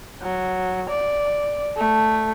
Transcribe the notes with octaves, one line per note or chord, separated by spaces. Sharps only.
F#3
D5
A3